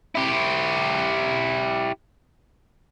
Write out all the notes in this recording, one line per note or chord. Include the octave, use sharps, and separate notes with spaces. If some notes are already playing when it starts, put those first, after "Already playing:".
E4 G4